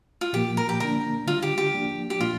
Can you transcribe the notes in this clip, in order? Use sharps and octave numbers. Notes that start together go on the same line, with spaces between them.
F4
A#2 F3 A#3 G4
A#4
G4
D3 A#3 D4 A#4
D3 G3 D4 F4
G4
G4
F3 A#3 D4
G4
A#2 F3 A#3 D4 F4